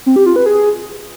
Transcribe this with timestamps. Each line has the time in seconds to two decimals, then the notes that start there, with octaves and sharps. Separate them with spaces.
0.06 C4
0.16 G4
0.26 F4
0.36 B4
0.46 G#4